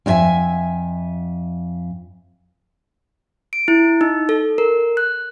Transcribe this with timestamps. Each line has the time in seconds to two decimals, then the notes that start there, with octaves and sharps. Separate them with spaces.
0.06 F2 C#4 F#4 E5 G#5
3.53 D7
3.68 E4
4.01 D#4
4.29 A4
4.58 A#4
4.97 F#6